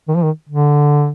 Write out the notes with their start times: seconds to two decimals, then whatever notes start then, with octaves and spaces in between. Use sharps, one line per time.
0.08 D#3
0.15 F3
0.23 D#3
0.49 D3